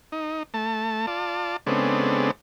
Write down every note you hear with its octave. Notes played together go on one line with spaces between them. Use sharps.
D#4
A3 A5
F4 D5 A5
C#3 G#3 B3 C4 D4 A4